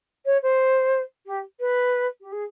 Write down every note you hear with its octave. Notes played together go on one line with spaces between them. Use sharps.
C#5
C5
G4
B4
G4
G#4